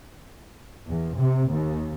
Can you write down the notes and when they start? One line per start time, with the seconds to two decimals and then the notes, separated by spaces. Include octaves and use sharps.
0.88 E2
1.18 C3
1.51 D#2